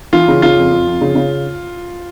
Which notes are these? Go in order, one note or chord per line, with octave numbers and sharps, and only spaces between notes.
E3 F4
C#3
C#3 F4
F2
F2
F2
C#3
C#3